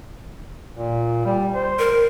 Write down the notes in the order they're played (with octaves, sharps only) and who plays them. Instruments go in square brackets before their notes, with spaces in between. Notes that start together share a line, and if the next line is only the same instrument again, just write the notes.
[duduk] A#2
G3
C5
[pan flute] A#4